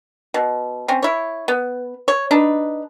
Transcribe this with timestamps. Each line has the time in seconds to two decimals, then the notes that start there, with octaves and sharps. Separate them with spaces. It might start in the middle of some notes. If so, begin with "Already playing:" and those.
0.34 B2
0.88 C4 C#4
1.02 E4 C#5
1.48 B3
2.08 C#5
2.31 D4 D#4 B4